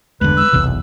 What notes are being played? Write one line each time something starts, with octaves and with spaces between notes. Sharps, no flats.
G1 E2 D3 G#3 A3 B4
G#3 E6
F#1 B1 E2 C3 E3